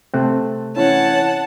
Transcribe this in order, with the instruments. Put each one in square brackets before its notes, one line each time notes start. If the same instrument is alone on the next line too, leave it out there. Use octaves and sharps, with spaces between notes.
[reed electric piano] C3 A3 C4 [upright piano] A5 F#6
[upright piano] E3 C#4 E4 [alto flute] C#5 [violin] F#5 A5